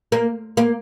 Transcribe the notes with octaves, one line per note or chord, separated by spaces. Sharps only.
A#3
A#3